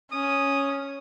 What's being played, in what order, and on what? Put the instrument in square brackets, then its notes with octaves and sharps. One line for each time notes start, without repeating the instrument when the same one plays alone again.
[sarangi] C#4 [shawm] D#6